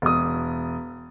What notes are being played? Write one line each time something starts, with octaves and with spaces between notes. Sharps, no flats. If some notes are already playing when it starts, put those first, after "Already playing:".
E1 D#6